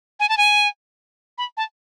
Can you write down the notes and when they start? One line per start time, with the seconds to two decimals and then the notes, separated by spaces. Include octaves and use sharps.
0.20 G#5
0.29 A5
0.38 G#5
1.38 B5
1.57 A5